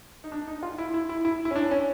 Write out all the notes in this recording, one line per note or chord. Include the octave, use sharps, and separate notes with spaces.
D#4
D4
D#4
F4
E4
E4
E4
E4
E4
C#4
D4
C#4